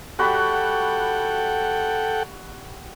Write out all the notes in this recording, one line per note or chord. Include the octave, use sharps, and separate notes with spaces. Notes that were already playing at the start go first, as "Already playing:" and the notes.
G3 F#4 A4 F#5 G5 B5